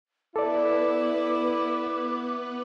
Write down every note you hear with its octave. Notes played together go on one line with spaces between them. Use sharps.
B3 E4 A4 B4 D5 D6